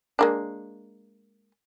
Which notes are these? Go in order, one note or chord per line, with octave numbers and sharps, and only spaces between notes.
G#3 A#3 D4